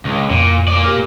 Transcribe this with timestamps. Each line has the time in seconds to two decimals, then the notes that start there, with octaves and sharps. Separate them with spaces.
0.05 C#2
0.31 F2 A#2
0.68 A#3 D5
0.84 G4 A#4 F6